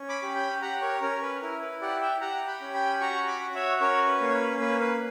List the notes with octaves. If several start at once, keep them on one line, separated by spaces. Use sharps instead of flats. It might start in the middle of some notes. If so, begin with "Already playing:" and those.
Already playing: C#4
B5 D6
G4
G5 B5
G4 F#5 A#5
A#4 C#5
C#4 A#4
B4
E4 A#4
B4
G4 D5 F#5
E5 G5
G4 F#5 A#5
G5 B5
C#4
G5 B5
F#4 A#5 C#6
B5 D6
F#4
C#5 E5
C#4 A#4 C#5
B4
A#3
C#5
B4
A#3 B4
B4